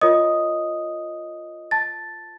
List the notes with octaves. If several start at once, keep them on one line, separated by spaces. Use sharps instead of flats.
F4 A#4 C#5 D#5 D#6
A5 A6